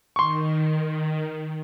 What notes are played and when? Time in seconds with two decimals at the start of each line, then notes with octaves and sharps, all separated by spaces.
0.16 D#3 C6 C#6